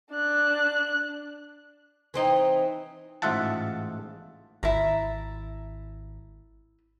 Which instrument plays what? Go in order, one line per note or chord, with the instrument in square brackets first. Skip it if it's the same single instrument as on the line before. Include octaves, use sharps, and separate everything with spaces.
[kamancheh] D4 F#6
[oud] E3 C4 D#4
[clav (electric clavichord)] A1 G#2 F4 E5 F#5 A5
[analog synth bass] G#1 [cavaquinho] E4 A5 A#5